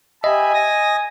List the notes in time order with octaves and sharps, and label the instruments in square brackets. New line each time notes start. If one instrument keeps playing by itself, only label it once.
[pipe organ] G4 E5 B5 [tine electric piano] D#5 [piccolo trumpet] G#5
[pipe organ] D#6 A#6